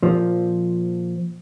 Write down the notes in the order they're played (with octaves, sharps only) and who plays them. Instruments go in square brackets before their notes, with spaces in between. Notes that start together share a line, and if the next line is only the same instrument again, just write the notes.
[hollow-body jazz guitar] A#2 F3